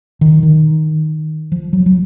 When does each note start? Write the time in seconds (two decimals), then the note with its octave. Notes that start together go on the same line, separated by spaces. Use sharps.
0.21 D#3
0.43 D#3
1.52 F3
1.73 F#3
1.86 F#3